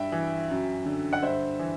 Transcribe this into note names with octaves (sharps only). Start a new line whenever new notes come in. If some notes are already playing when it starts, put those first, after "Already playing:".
Already playing: G2 E5 G5
E3
F#2
D3
F#5
G2 C5 E5
E3